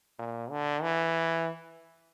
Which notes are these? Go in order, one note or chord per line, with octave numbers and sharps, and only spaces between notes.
A#2
D3
E3